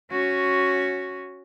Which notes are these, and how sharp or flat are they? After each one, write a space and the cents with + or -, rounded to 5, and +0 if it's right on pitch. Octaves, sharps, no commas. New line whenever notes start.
C#4 +0 F#4 +0